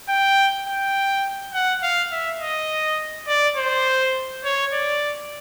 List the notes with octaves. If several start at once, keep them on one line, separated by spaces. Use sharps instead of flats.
G5
G5
F#5
F5
E5
D#5
D5
C5
C#5
D5